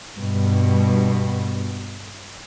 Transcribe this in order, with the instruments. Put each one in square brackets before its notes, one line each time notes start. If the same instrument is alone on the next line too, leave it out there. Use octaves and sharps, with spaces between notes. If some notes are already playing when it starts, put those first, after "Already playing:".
[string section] G2 B2